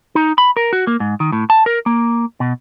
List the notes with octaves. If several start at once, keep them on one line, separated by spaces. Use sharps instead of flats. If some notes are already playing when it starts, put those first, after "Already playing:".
D#4
B5
A#4
F#4
A#3
G#2
D#3
A2
A5
A#4
A#3
B2